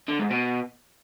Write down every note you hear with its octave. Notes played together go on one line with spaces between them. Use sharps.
D3
G#2
B2